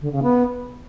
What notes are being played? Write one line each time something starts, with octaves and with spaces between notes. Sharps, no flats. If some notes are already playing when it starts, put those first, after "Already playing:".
D3
C#3
B3